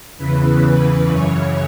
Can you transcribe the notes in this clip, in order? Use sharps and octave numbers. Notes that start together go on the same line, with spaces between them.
E2 C#3 E3 B4
F#2 C#3 E3 C#5